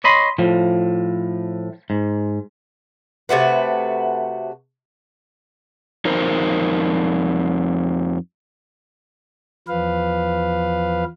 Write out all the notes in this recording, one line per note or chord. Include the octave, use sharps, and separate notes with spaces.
C#5 D#5 B5 C6
A2 F3
G#2
C3 A3 F#4 B4
F2 D#4 A#4 C5
E2 F3 B4 F5